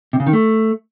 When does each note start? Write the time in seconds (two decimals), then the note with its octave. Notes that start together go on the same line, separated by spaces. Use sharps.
0.13 C3
0.20 C#3
0.27 D#3
0.33 A3